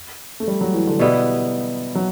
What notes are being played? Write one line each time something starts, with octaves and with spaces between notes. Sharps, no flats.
A3
G3
F#3
E3
D3
B2 E3 G3 B3 E4
F#3